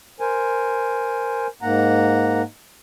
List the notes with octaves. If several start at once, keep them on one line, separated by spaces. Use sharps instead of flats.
A#4 C5 G#5
G#2 A#3 F#5 A#5